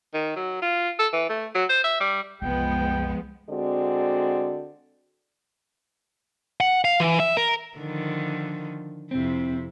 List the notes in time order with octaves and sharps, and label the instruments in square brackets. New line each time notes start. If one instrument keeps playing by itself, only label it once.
[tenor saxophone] D#3
F#3
F4
A4
E3
A3
F#3
C5
E5
G3
[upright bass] C2 F#2 [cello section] F3 G#3 B3 [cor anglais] G5
[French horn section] D3 G#3 C4 F#4 D5
[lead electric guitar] F#5
F5
E3
E5
A#4
[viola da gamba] D3 D#3 F3
[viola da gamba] F2 C3 E4 [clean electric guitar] C4